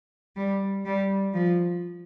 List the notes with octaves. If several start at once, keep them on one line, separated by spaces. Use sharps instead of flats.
G3
G3
F3